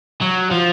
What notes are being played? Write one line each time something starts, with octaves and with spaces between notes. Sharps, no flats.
F#3
F3